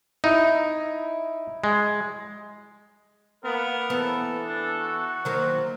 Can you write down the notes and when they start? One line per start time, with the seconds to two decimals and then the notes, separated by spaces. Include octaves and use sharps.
0.24 D#4 E4
1.64 G#3
3.44 A#3 B3 A#4
3.90 E3 B3 A4
4.45 D4
4.78 F#4
5.25 D#3 F#3 A#3 C5